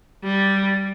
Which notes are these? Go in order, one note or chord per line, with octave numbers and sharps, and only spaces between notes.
G3